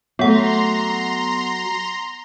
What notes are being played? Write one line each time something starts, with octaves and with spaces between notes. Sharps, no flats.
F#3 A3 B3 F#5 A#5 C6